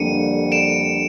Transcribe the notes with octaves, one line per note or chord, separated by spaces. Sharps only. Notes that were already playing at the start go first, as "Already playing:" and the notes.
Already playing: F2 D3 G3 A#3 D4 C#7 D#7
D7 E7